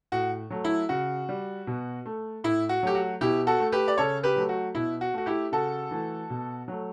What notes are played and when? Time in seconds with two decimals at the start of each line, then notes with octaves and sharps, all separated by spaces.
0.12 A2 F#4
0.50 F#3 A3
0.64 E4
0.89 C#3 F#4
1.29 G3
1.67 B2
2.06 A3
2.44 A2 E4
2.69 F#4
2.83 F#3 A3 G4
2.95 F#4
3.21 B2 E4 G4
3.47 F#4 A4
3.60 A3
3.72 G4 B4
3.88 D5
3.97 C#3 A4 C#5
4.23 G4 B4
4.36 F#3 A3
4.49 F#4
4.75 B2 E4
5.01 F#4
5.14 A3 F#4
5.26 E4 G4
5.52 C#3 F#4 A4
5.91 E3 A3
6.30 B2
6.68 F#3 A3